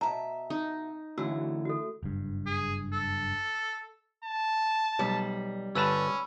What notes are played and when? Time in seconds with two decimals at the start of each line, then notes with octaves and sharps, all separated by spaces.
0.01 B2 E5 A5 A#5
0.50 D#4
1.18 D3 E3 A3 C#4 F#4 E6
1.65 F#4 A4
2.03 F#1 G2
2.46 G#4
2.93 A4
4.24 A5
4.99 B1 G3
5.75 G1 C#4 B4 A5 B5 E6